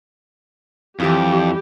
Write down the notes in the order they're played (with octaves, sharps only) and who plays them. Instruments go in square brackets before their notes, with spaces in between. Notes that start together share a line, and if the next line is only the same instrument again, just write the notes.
[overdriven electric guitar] F2 [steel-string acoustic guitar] E3 E4 [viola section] G3 G4